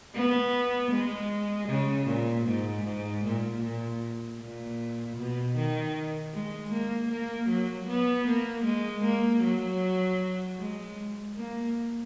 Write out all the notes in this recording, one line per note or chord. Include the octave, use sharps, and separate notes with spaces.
B3
G#3
C#3
A#2
G#2
G#2
A#2
A#2
A#2
B2
D#3
G#3
A#3
A#3
F#3
B3
A#3
G#3
A#3
F#3
G#3
A#3